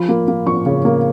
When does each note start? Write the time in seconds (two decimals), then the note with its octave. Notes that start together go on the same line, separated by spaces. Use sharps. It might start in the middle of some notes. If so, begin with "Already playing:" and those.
Already playing: F3 B5
0.09 A#3
0.28 A#3
0.46 F3 C#6
0.66 C#3
0.85 A#3